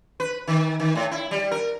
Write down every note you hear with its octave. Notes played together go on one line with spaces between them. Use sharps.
B4
D#3
D#3
A2
E4
G3
A#4